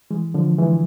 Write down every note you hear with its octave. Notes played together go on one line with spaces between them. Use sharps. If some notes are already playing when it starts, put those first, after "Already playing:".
E3 G#3
D3 F3
E3 G#3